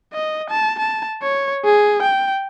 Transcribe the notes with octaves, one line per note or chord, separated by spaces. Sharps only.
D#5
A5
A5
C#5
G#4
G5